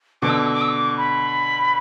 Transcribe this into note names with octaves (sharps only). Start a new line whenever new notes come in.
B2 D3 D6
E6
D6
E6
D6
E6
D6
B5